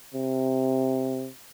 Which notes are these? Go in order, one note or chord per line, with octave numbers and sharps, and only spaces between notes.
C3